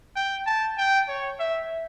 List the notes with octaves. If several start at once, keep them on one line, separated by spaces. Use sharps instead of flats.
G5
A5
G5
C#5
E5